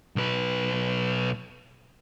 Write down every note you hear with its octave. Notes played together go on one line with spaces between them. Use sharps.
B1 B4